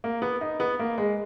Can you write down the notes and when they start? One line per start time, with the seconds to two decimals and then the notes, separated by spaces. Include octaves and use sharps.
0.04 A#3
0.22 B3
0.41 D#4
0.60 B3
0.80 A#3
0.98 G#3